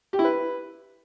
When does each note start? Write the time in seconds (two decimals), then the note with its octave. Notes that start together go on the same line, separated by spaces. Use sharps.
0.13 G4
0.19 E4
0.25 B4